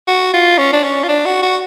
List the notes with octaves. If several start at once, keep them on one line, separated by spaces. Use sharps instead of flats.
F#4
F4
C#4
D4
C#4
F4
D4
F#4
F#4